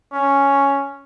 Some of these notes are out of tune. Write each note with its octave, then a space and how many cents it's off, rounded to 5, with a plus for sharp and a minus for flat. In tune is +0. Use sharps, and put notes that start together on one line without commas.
C#4 +0